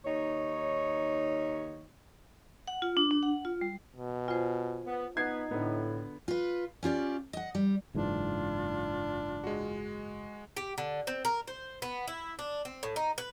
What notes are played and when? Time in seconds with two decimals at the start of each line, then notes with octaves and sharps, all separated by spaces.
0.05 D#2 D#4 C#5
2.68 F#5
2.82 F4
2.97 D4
3.11 D4
3.23 F#5
3.45 F4
3.61 G3
3.96 B2
4.28 F4 C5 G#5
4.87 B3
5.17 B3 D#4 B4 G#6 C7
5.51 A2 D3 B3
6.28 F4 B4
6.83 C#4 F4 G4 D5
7.33 D#5 F#5
7.55 G3
7.95 F#1 G#2 E3 D4 F4
9.44 G#3 F#4
10.57 G4
10.78 D3
11.07 C4
11.25 A#4
11.48 C5
11.82 B3
12.07 E4
12.39 D4
12.65 C4
12.83 A2
12.96 D#4
13.18 B4